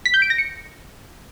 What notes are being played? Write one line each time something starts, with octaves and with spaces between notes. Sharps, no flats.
B6
G6
D7
A#6
C#7